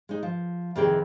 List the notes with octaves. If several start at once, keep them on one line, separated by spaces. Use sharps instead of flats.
G#3 D#4
F3
F2 C3 D#3 E3 G#4 G5